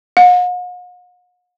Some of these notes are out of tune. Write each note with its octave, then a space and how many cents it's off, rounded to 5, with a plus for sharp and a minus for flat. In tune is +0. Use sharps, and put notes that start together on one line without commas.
F#5 -45